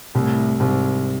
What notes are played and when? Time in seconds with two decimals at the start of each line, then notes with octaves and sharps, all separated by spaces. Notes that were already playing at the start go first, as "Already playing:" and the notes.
0.15 C2 A2
0.60 C2 G#2